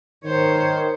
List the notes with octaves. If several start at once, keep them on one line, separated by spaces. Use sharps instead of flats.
D#3 C5 C#5